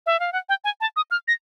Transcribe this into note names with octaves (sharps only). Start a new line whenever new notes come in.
E5
F5
F#5
G5
G#5
A5
D#6
F6
A#6